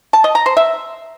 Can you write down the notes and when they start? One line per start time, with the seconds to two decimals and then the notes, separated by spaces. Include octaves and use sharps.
0.13 A5
0.24 D#5
0.35 A#5
0.46 C5
0.57 E5